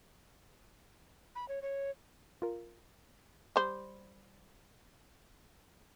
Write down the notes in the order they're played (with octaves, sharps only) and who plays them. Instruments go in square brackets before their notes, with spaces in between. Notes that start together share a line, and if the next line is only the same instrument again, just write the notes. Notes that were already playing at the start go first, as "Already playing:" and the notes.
[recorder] B5
C#5
C#5
[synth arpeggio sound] F4 A#4
[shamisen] G3 C5